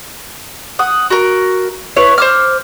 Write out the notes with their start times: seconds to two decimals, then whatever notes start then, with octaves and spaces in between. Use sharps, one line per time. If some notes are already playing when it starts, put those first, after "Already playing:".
0.79 F#5 D#6
1.10 F#4 A#4
1.96 E4 B4 C#5
2.18 C5 D6 F6